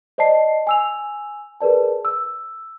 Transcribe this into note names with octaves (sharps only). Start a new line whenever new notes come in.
C5 D5 D#5 A5 C7
G#5 E6 F7
G#4 A#4 B4 D5 A5
E6